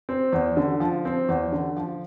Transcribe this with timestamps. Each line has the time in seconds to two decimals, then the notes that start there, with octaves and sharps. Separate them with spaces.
0.09 C4
0.32 E2
0.57 D3
0.80 F3
1.05 C4
1.28 E2
1.52 D3
1.77 F3